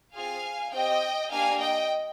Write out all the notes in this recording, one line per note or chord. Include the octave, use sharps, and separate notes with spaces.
C4 F4 G#4 F5 G#5
C4 G4 D#5 G5
A#3 D4 G4 F5 G#5
D#5 G5